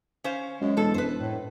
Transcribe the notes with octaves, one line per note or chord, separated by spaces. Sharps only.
C#4 C5 F5
F#2 G#3
E1 G2 A4
F#2 B4 C5
A2